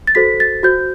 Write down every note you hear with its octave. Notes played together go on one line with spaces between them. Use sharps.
A6
F#4 A4 C5 B6
A6
F#4 C5 G6